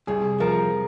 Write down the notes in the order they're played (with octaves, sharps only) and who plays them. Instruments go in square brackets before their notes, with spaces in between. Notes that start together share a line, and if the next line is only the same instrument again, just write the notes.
[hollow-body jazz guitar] C2 [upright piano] G#4
[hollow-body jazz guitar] F3 [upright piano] A#4